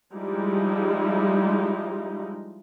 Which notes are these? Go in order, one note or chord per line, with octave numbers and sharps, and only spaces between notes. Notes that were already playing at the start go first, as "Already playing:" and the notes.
F3 G3 G#3 D#4 E4